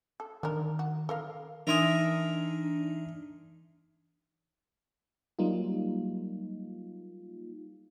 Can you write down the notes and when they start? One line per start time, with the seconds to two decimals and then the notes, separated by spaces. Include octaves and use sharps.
0.20 A4
0.43 D#3 D4 A#4
0.79 F#4
1.09 A4 A#4 F5
1.67 E3 D4 D#4 A#4 E5 G#5 C6 D#6
5.39 F#3 G3 A#3 D#4 F4